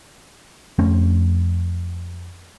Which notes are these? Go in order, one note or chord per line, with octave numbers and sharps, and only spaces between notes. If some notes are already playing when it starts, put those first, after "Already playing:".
F2 A3 C4 C#4